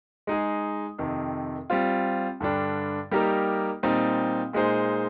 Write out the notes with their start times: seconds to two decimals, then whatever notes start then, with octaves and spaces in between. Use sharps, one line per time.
0.27 G#3 D#4 G#4
0.98 F2 C3 D#3
1.70 G3 C4 F4
2.40 G2 D3 G3 D4
3.11 G3 A#3 D#4 G4 A#4
3.83 A#2 G3 C4 D#4
4.53 A#2 G#3 D#4 G#4 C5